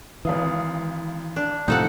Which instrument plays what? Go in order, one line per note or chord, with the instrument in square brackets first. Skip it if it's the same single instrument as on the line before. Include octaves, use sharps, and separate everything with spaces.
[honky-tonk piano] G#1 F5 D#6 [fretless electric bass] E3
[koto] D4
[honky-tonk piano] D#2 [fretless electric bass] A2 C3 F3 [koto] D#4 A4 F#5